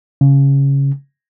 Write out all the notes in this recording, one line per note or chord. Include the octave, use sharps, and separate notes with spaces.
C#3